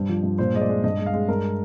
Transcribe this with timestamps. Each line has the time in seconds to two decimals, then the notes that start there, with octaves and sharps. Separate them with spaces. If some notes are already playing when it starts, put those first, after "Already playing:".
Already playing: G2 G3 C5
0.09 F3
0.23 G2
0.38 A#2 C5
0.54 G#3 D#5
0.61 D5
0.69 G#3
0.84 G2 D#5
0.99 G#3
1.06 F5
1.14 G#3
1.29 G2 A#4